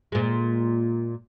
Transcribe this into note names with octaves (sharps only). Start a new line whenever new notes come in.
A#2 G#3